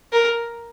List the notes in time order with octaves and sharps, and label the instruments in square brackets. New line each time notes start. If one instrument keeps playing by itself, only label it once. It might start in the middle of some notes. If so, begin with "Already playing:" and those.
[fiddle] A#4